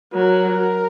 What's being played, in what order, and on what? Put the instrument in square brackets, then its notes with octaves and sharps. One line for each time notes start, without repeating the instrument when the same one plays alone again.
[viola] F#3 [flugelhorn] A#4